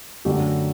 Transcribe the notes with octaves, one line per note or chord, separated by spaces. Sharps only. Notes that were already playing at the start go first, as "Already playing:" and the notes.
F#2 D3 F#3 A3 G4